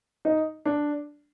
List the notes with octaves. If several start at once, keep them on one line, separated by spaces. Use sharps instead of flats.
D#4
D4